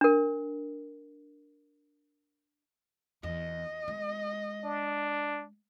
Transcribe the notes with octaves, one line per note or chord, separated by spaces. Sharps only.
D4 A#4
E2 D#5
G#3
D4